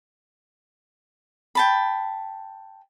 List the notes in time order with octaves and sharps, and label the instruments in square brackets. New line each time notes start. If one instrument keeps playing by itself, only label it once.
[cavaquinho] G5 A5 B5